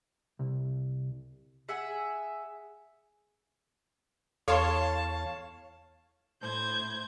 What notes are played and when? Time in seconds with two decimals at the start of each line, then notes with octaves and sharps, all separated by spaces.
0.39 C2
1.69 G#4 E5 F#5 G#5
4.48 E2 A4 C#5 F5 A5 C6 C#6
6.39 A2 C5 G6 G#6